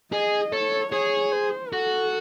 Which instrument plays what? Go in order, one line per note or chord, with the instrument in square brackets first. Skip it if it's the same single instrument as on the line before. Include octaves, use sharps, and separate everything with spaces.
[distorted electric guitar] G#4 [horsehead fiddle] D#5
[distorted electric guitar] A4 [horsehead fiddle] C#5
[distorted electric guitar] G#4 [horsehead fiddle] C#5
[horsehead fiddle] C5
[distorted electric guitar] F#4 [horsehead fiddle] A4